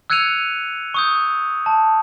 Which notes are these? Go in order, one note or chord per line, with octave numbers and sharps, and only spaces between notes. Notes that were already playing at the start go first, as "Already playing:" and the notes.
E6 F#6 G#6 C#7 D#7 F7
C#6 D#6 G6
A5